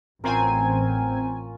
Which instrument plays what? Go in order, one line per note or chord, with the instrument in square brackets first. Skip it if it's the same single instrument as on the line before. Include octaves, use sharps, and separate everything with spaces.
[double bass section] A1 [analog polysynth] C4 G#5 [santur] C#4 F4 A#4